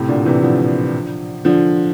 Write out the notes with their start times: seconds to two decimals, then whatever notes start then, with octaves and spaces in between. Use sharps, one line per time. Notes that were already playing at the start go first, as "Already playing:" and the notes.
Already playing: A2 C3
0.08 A#2 D3
0.25 C3 E3
0.42 D3 F3
1.45 D3 F3